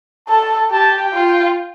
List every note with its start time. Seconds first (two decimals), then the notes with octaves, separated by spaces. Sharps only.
0.28 A4 A5
0.71 G4 A5
0.99 G5
1.14 F4
1.28 G5